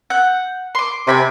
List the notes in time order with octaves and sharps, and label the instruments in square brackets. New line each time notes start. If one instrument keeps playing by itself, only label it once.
[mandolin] F#5 G6
C6 D6
[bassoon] C3 [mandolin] G#5 B5 D6